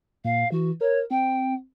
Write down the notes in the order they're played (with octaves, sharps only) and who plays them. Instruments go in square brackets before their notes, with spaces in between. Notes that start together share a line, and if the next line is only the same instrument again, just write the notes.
[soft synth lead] A#2 [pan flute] F5
[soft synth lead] E3 [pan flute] F#4
[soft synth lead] A#4 [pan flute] C#5
[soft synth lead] C4 [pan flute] G5